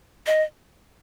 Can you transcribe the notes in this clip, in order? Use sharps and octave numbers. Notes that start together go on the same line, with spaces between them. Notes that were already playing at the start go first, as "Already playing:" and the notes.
D#5